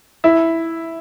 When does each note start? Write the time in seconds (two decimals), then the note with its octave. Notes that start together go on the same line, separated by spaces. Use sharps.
0.24 E4